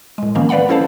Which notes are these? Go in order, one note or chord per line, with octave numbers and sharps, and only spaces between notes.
A2 G#3
D#3 F3 A#3 B3 C#4
B4 D5 F5 F#5 B5
C#4 E4 A4 C5 F5 A5